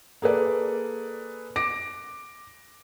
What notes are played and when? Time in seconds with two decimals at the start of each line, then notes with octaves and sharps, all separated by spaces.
0.22 A#3 G#4 A4 B4 D5
1.56 D6 A#6 D7